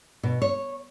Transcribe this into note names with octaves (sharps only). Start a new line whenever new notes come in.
B2
C#5